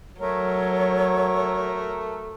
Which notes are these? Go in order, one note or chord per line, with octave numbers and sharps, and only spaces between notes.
F#3 A3 A#4 C#5